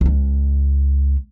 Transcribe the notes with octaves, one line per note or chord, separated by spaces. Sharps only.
C#2 G#3